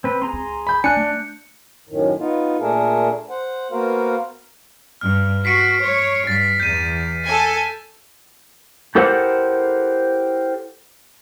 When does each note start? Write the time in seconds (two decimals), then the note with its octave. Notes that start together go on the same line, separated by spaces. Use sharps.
0.04 C4 B4
0.22 C4 G#4 A#5 C6
0.33 C#2
0.67 B5 G6
0.84 D4 G#5 F#6 C#7
0.97 A3 F#6
1.89 F#2 A2 D#3
2.19 B3 D#4 F4
2.60 A#2 A3 D4 G#4 A#4
3.30 C5 F#5
3.72 A#3 B3 F#4 A#4 C5 F5
5.01 G2 F6
5.45 F#4 B6 C7 D7
5.81 C#5
6.27 G2 A6 B6
6.60 E2 G6 D#7
7.25 A4 G#5
8.95 E4 G4 A4 A#4 C5 F#5